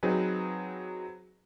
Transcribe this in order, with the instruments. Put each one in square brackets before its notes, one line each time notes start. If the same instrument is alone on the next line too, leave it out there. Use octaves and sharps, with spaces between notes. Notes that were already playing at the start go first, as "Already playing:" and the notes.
[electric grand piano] F#3 C4 D#4 G#4 B4